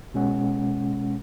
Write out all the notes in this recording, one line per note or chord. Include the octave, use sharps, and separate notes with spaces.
B2 G#3 C#4 F#5